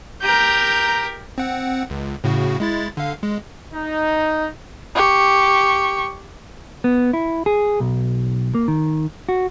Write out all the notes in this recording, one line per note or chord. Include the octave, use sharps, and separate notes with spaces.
G4 A#4 A#5 G6
C4 F#5
C#2
A2 C#3 F#4
G#3 E4 A6
D3 F5
G#3
D#4
G4 C#6
B3
E4
G#4
B1
A#3
D#3
F#4